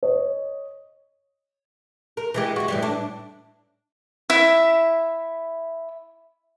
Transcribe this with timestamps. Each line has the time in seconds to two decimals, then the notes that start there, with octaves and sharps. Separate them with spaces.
0.03 C#5 D#5
2.17 A#4
2.34 E3 G#3 G4
2.56 G#3 F#4
2.68 A2 E3 G3
2.82 D4
4.30 E4 E5